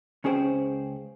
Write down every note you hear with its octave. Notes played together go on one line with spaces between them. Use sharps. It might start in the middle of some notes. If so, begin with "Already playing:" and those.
C#2 C#4 G#4 C5 G5